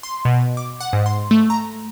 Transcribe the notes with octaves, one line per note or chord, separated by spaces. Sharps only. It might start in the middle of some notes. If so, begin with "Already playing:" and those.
C6
B2
D6
F#5
G#2
C6
A3
A#5